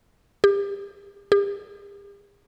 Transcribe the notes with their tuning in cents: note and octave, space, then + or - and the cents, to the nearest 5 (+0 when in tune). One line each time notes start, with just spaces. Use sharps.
G4 +30
G4 +45